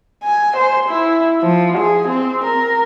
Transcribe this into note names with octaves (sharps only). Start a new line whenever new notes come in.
G#5
C5
E4
F3
G#4
C4
A#4